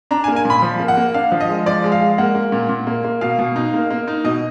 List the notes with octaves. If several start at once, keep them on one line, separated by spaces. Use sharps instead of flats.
D4 A#5
G#5
A#3
G#5
A#2 B5
F3
A#3
F#5
A#3
D4 F5
F3
D#5
G#3
F3 D5
G#3
F5
G#3
A#3 F#5
A#3
A#2
A#2
A#3
A#3
B2 F5
B2
D#4
A#3
A#3
D#4
B2 D#5